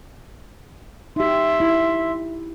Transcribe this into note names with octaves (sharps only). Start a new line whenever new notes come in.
D#4 G4 E5 C6
E4